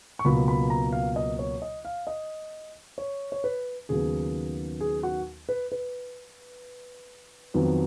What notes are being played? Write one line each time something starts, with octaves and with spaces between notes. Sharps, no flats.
C#6
C#2 B2 F#3 A#3 B5
B5
A#5
F5
D#5
C#5
D#5
F5
D#5
C#5
C#5
B4
D#2 C#3 F#3 B3 G#4
G#4
F#4
B4
B4
F2 D#3 F#3 B3